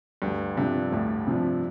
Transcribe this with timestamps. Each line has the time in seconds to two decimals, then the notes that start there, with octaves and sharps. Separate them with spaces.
0.22 D2 G2
0.57 G2 C3 F3 D4
0.92 D2 A2
1.27 C3 F3 D4